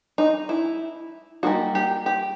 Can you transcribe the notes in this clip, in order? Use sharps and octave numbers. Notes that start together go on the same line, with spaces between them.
D#4
E4
G3 A#3 D#4 F#4
G4
G4